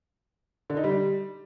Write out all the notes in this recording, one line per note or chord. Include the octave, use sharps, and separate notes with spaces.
D3
D#4
G3